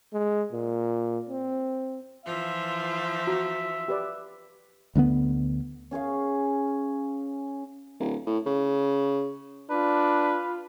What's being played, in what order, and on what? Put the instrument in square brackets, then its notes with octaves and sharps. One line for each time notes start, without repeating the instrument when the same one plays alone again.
[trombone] G#3
A#2
C4
[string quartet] E3 F3 F4 [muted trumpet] E5
[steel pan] F#4 A#5
G4 B4 D5
[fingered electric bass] D2 D3 A#3 B3
[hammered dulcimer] C#4 G#4 C#5 F5
[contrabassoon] D1
A2
C#3
[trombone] D4 [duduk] F4 [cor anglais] B4